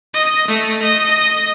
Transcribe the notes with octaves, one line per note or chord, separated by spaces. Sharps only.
D#5
A3
D#5